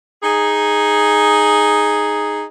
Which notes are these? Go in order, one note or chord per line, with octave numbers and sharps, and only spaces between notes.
D#4 G#4